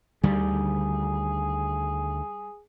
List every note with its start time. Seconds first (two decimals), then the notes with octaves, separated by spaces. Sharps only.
0.23 D2 D3 D#3 G3 G#4